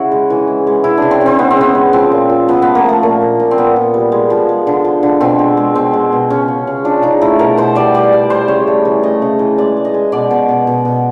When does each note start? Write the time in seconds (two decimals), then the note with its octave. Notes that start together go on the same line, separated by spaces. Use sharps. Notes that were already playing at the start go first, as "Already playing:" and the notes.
Already playing: C#3 E4 F#4
0.12 G#3
0.30 E3
0.47 G#3
0.67 G#3
0.84 C#3 E4
0.97 C#3 D4
1.11 C4
1.21 C#3 C4
1.39 G#3 B3
1.51 C4
1.57 C#3 B3
1.75 G#3
1.93 F3 C4
2.12 A#2
2.29 A#2
2.48 F3 B3
2.62 A3 B3
2.75 A#3
2.84 F3 A3
3.03 A#2 A#3
3.21 A#2
3.40 A#2
3.51 C4
3.58 A#2 B3
3.76 A#2
3.94 G3
4.12 G#3
4.30 F3
4.49 G#3
4.67 D3
4.85 F3
5.03 D3
5.21 B2 C4
5.39 G#3
5.57 G#3
5.75 B2 C4
5.93 G#3
6.13 B2
6.30 C#3 C#4
6.48 C#3
6.67 C#3
6.85 F3 D4
7.03 C#3 D#4
7.21 A3 E4
7.39 B2 A#4
7.57 B2 C5
7.75 G3 D5
7.94 G3 D5
8.12 G3
8.30 G3 C5
8.48 C#3 C#5
8.67 A3
8.85 E3
9.03 A3 D#5
9.22 C#3
9.39 E3
9.58 G#3 D5
9.77 G#3
9.85 D#5
9.94 G#3
10.12 B2 D5
10.31 B2
10.48 B2
10.67 B2
10.85 B2